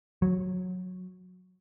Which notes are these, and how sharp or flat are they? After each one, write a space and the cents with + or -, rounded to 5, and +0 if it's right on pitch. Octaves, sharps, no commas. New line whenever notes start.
F#3 -15